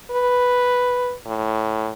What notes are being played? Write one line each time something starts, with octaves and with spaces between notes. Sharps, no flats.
B4
A2